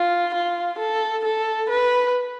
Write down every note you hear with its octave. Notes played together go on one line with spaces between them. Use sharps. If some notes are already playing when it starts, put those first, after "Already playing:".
Already playing: F4
F4
A4
A4
B4